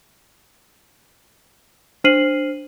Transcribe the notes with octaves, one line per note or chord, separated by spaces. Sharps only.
D4 C5 F6 C7 D#7 F#7